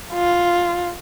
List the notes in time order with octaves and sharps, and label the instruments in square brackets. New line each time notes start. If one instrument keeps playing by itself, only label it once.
[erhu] F4